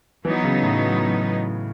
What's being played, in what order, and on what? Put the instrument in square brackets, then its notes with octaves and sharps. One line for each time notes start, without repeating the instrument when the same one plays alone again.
[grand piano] E3 [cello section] F#3 B3 D#4
[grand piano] C#3
A2